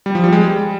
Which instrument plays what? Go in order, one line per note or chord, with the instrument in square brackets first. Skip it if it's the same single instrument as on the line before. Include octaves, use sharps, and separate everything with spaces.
[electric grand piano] G3
F3
G3
G#3
G3